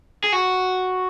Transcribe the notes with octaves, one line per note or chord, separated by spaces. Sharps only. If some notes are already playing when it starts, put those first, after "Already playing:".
G#4
F#4